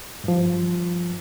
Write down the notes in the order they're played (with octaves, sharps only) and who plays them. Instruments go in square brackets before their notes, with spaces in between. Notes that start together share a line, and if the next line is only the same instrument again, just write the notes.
[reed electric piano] G2 F3